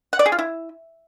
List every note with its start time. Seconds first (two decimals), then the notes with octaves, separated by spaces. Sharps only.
0.13 F#5
0.19 D5
0.26 G#4
0.32 F4
0.39 E4